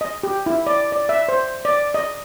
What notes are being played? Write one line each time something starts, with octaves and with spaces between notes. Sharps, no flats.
D#5
G4
E4
D5
D5
E5
C5
D5
D#5